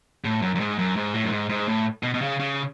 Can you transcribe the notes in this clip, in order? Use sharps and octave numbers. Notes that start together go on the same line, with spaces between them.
A2
F#2
F#2
G#2
F#2
G#2
A2
F#2
G#2
G#2
A2
B2
B2
C#3
C#3